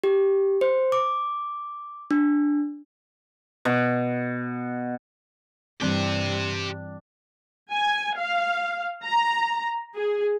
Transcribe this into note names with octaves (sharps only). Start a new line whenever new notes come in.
G4
C5
D6
D4
B2
G2 E3 G3 C4 D4 G4 C6
G#5
F5
A#5
G#4